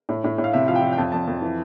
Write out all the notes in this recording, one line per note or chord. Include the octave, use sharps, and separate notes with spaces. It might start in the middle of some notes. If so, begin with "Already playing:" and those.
A2
A2
A2
F5
C3 E5
F3 F5
G5
F3
G5
F2 A5
F2 A5
F2
E3